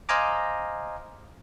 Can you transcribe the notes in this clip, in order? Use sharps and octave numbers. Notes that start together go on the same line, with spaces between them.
C5 D#5 F5 G#5 A#5 D6